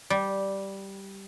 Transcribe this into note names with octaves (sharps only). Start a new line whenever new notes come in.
G3